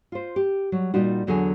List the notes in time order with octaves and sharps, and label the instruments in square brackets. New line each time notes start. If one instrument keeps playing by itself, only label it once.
[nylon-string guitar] F4 C5
G4
F#3 G3
A#2 G3 D#4 F4 F#4
E2 D3 F#3 G#4 A4 G#5